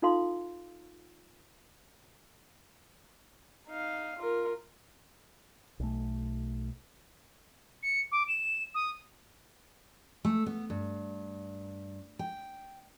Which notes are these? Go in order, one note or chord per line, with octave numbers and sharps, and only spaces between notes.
D#4 F4 A4 F5 C6
D#4 F5
F4 A#4
B1 A3
C#7
D6
E7
D#6
A3
B3
G2
G5